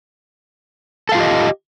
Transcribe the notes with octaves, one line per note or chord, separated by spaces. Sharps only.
F4 G4 A4 D#5 F5